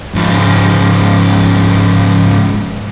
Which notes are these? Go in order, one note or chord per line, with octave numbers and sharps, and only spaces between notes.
G#2 F3